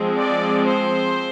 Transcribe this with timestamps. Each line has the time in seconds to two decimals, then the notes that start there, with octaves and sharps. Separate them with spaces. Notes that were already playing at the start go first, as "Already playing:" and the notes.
Already playing: F3 G#3 C4
0.15 D5
0.68 C5